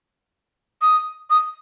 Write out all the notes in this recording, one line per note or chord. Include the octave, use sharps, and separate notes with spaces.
D#6
D#6